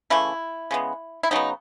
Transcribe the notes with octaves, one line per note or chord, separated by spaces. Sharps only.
C#3 E3 A3 E4
C#3 G#3 B3
E4
C#3 F#3 B3 D#4